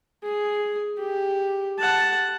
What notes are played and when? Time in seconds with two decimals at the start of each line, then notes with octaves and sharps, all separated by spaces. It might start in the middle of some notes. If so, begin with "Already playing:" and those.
0.24 G#4
0.99 G4
1.79 F#5 A5